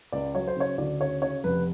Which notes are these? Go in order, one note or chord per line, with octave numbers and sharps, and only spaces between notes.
C#2 D5
F#3 C#5
C5
C#3 C#5
D2 D5
C#3 C#5
C#3 C#5
F1 B4